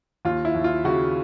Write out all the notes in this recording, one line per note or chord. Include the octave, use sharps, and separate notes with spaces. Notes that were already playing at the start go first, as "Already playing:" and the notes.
D#2 F4
E4
D#2
F4
C#3 F#4